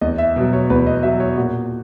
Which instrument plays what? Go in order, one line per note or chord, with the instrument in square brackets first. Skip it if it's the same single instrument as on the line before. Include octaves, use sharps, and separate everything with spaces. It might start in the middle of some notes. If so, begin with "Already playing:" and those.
[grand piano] E2 D#5
E5
B2 F#3
C#5
E2 B4
D#5
B2 F#3 E5
C#5
A#2 F#4